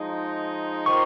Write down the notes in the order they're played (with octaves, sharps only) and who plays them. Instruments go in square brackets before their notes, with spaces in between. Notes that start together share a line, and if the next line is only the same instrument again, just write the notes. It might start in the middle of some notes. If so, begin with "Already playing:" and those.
Already playing: [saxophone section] F3 G#3 D#4
[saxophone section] D#3 A#3 F4 C5 D#5 [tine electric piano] C#6